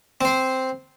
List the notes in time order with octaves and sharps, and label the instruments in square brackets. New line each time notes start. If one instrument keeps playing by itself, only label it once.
[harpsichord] C4 C5